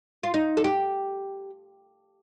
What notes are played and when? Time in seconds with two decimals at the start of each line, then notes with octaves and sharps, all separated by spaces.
0.23 F4
0.34 D#4
0.57 A4
0.64 G4